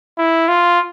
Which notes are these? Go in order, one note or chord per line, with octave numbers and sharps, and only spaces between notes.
E4
F4